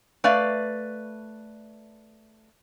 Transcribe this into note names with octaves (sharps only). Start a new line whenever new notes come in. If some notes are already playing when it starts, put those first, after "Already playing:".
A3 B4 D5 F5